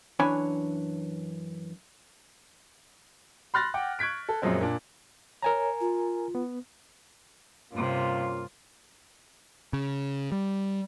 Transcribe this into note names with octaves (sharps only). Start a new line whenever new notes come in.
F#2 E3 D4 C#5 G#5 B5
B5 C6 F6 F#6 A6 A#6
F#5 G5 D6
C#6 F#6 G#6 B6 D7
A4
F#2 A#2 F3 F#3 G#3 C4
A#2 D4
A#4 C#5 G#5 A#5
F4
B3
G2 C3 A#3 C#4 F4
C#3
G3